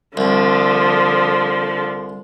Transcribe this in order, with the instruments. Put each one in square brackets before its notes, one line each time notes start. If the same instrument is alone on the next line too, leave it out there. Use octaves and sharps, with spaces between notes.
[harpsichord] C2 [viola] D3 F3